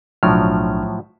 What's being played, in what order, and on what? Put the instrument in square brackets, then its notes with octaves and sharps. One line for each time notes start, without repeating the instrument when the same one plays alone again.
[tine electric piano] B1 D4 F6 [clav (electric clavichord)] A2 F3 F#3